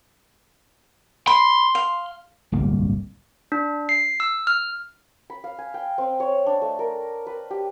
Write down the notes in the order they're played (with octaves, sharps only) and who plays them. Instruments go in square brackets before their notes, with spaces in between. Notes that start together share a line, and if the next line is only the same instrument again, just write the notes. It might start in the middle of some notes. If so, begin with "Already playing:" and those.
[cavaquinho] B5 [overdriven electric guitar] C6
[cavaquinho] F5
[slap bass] D1 G1 C2 A#3
[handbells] D4
C7
E6
F6
[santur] B5
F5
G#5
G5
C4
C#5
D4
A3
A#4
B4
G4